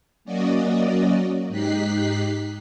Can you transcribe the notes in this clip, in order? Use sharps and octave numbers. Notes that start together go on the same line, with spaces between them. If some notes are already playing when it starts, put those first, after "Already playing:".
F#3 A#3 C#4 F#4 D5 D#5
G#2 D#4 G4 F#6 B6 C7